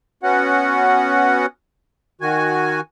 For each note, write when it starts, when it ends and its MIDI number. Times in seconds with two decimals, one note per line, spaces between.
0.23 1.46 59
0.23 1.46 61
0.23 1.46 66
0.23 1.46 78
2.21 2.81 51
2.21 2.81 66
2.21 2.81 80